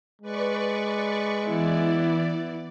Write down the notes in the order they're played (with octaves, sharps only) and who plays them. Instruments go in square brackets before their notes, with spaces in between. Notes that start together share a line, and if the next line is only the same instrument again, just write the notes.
[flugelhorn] G#3 [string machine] B4 D5 C#6
[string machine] E3 D5 [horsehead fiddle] B3 E4